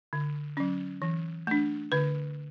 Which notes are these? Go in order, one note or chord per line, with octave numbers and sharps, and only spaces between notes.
D3
F#3 C#4
E3
A3 D4
D3 B4